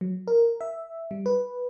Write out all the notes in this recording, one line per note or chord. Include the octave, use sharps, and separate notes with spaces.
F#3
A#4
E5
G3
B4